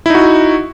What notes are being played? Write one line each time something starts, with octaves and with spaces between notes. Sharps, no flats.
D#4 E4 F#4